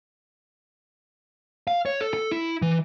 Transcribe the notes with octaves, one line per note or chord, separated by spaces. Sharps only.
F5
C#5
A4
A4
E4
E3